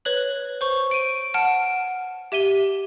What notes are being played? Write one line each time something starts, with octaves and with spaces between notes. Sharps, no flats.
B4 C#5 F#6 F#7
C5 C#6
D7 D#7
F#5 A5 F6 D7
G4 E5 D#7 G7